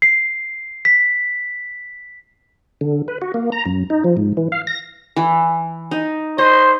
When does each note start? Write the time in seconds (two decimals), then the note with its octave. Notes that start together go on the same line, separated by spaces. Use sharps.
0.02 C7
0.85 B6
2.81 D3
3.08 B4
3.22 F#4
3.34 A#3
3.52 A#5
3.66 F#2
3.90 D#4
4.04 F3
4.17 G#2
4.37 E3
4.52 F5
4.67 A#6
5.17 E3
5.91 D#4
6.38 C5 D#5